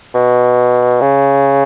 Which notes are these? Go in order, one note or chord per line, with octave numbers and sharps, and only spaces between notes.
B2
C#3